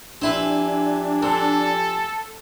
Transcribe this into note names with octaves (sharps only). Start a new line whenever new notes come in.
F3 C4 D4 E4 G4 B4 G#5
C4 A4